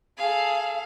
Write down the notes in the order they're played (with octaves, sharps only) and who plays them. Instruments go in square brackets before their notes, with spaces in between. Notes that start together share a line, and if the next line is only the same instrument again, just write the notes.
[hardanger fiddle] G#4 A4 [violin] F5